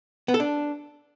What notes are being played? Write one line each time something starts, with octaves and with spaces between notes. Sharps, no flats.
B3
A4
D4